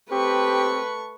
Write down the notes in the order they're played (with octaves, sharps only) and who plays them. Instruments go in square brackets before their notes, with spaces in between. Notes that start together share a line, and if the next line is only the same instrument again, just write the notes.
[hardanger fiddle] A3 C#6 [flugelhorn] C4 [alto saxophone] G4 [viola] B4